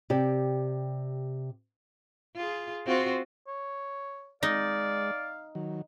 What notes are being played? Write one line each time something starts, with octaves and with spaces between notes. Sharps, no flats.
C3 G4 D5
F4 G#4
C4 F4 F#4
C#5
G#3 D#4 D5 F5
D#3 F#3